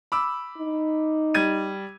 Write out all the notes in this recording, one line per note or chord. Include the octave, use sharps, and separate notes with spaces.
B5 D6 E6
D#4
G3 G#6 D#7